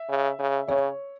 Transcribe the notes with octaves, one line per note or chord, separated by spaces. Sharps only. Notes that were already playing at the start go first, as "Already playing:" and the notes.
Already playing: E5
C#3
C#3
C#3 C#5